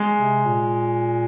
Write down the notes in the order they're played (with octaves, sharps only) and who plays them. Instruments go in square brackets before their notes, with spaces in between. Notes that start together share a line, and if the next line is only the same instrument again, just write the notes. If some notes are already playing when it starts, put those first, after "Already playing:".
Already playing: [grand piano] G#3
[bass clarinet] C3
A#2